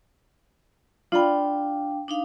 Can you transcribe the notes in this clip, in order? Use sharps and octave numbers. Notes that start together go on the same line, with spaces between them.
D4 F4 D5 F5 G5 B5
D4 D#4 F5